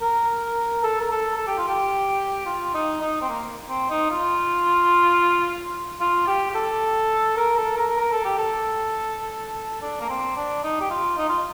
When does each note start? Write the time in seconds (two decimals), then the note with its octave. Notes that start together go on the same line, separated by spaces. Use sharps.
0.01 A#4
0.84 A4
1.01 A#4
1.11 A4
1.37 A4
1.47 G4
1.58 F4
1.68 G4
2.46 F4
2.74 D#4
3.01 D#4
3.21 C4
3.29 A#3
3.69 C4
3.90 D#4
4.11 F4
6.00 F4
6.27 G4
6.50 G4
6.55 A4
7.37 A#4
7.57 A4
7.77 A#4
7.98 A#4
8.12 A4
8.25 G4
8.38 A4
9.82 D4
10.00 A#3
10.09 C4
10.37 D4
10.64 D#4
10.80 G4
10.91 F4
11.17 D#4
11.29 F4